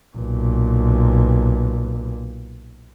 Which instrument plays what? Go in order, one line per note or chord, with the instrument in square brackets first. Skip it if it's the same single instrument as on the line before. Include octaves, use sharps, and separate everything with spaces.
[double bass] B1 A#2